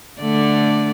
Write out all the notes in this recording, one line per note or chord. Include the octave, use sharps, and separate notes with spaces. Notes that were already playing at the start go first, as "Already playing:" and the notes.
D3 A3 D5